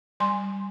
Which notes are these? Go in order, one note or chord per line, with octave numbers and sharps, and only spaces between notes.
G3 G#5 C6